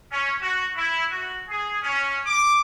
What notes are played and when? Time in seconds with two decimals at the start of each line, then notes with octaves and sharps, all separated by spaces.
0.10 C#4
0.41 F#4
0.75 E4
1.09 F#4
1.49 G#4
1.82 C#4
2.25 D6